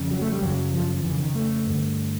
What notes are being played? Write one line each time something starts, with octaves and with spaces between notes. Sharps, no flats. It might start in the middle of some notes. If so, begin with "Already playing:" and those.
Already playing: F2 C#3
F#3
A3
G3
F#2 C#3 F#3
F3
F3
F2 C#3 E3
D#3
A3
G2 D3